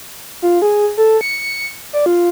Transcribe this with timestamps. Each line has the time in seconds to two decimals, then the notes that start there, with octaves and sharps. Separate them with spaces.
0.42 F4
0.62 G#4
0.97 A4
1.21 C#7
1.93 D5
2.06 F4